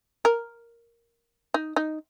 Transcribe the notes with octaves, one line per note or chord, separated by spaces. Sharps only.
A#4
D#4
D#4